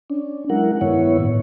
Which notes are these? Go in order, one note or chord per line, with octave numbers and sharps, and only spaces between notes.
C#4 D4
F#3 G#3 E4 A#4 F#5
G2 D#3 B3 E4 C#5
A2